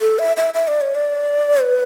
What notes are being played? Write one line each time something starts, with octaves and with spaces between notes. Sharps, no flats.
A4
E5
E5
E5
D5
C#5
D5
B4